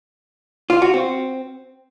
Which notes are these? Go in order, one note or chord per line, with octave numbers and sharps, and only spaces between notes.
F4
F#4
C4